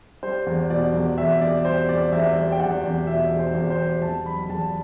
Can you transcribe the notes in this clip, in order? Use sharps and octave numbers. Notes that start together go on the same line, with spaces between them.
G3 C5
E2
B2 D5
E2
E2 E5
E2 D5
G3 C5
E2 D5
E2 E5
G3
G5
E2 F#5
E2
B2 E5
E2
C5
E2
C5
G3
E2 A5
F#3 B5
E2 A5